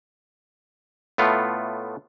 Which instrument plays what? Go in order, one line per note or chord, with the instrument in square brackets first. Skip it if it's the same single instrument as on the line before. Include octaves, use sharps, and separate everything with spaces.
[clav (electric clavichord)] A2 A3 B3 F4